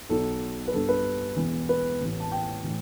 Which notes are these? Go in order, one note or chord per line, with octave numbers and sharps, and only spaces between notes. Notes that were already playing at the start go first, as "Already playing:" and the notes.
B1 B2 A4
B4
G1 G2 D3 A4
B4
E1 E2 E3
B4
A1 A2 E3
A5
G5
A2 E3